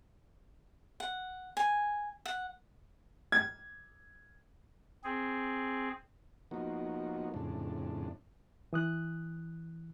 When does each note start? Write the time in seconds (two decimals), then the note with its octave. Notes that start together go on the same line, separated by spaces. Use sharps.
1.00 F#5
1.57 G#5
2.25 F#5
3.32 G#6
5.04 C4 G#4
6.51 F3 A#3 B3 D#4 F#4
7.34 F2 A2 C#3 D4
8.73 E3 D#6 F#6